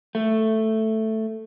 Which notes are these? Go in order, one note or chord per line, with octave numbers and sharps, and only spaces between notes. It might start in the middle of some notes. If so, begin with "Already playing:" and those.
A3